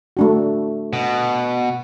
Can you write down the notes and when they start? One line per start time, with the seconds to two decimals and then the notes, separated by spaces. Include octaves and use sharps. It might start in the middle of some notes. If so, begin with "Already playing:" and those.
0.17 A3 D4 F#4
0.93 B2